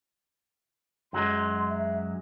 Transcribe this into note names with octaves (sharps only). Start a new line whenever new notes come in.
F#2 F#3 G#3 C6
E5